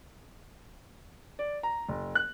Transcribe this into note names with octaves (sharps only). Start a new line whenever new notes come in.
D5
A#5
F#1
F#6